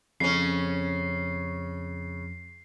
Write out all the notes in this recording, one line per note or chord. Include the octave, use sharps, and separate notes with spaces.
F2 C#3 C#4 C7